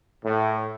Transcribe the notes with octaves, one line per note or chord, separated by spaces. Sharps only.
A2